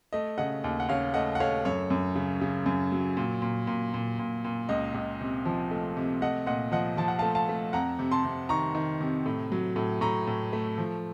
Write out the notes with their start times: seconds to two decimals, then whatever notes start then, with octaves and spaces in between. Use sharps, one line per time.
0.13 A3 D#5
0.38 C#3 D#5 F#5
0.64 D#2
0.80 F#5
0.89 C#3 C#5 F5
1.14 A3 D#5 F#5
1.35 F#5
1.40 A3 C#5 F5
1.65 F#2 C#5
1.90 F#2
2.16 C#3
2.41 C#3
2.66 F#2
2.92 F#3
3.17 A#2
3.42 A#2
3.67 A#2
3.94 A#2
4.19 A#2
4.45 A#2
4.69 C#2 D#5
4.94 C#2
5.21 C3
5.45 F3
5.71 A3
5.97 C3
6.21 A3 D#5 F#5
6.46 A#2 D#5 F#5
6.72 F3 D#5 F#5
6.97 F3 A5
7.08 F#5
7.19 A3 F5 A5
7.35 F5 A5
7.49 A3
7.73 F2 F#5 A#5
7.99 C3
8.11 A5 C6
8.25 C3
8.49 D#3 A#5 C#6
8.75 D#3
9.00 C3
9.26 A2
9.52 F#3
9.76 A2
10.01 A2 A#5 C#6
10.27 A2
10.53 A3
10.78 F3